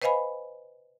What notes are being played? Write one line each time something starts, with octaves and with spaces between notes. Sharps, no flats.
B4 C5 D#5 F5 G#5 B5